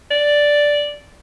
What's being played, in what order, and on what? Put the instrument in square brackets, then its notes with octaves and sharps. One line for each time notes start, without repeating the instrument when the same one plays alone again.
[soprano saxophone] D5